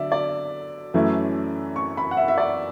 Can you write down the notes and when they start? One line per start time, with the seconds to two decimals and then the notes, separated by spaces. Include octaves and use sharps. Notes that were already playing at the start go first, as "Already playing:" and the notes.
Already playing: D3 F#3 D5 E5
0.12 D5
0.94 F#2 E3 A3 C#4 E4
1.76 C#6
1.97 B5
2.11 F#5
2.17 E5
2.28 E5
2.38 D5